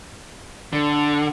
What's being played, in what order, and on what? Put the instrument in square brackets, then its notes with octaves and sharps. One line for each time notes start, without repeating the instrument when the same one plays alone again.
[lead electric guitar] D3